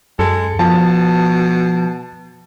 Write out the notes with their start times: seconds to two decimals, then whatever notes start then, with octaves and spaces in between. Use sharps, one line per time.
0.19 F#2 G#3 A4
0.59 B2 F3 A5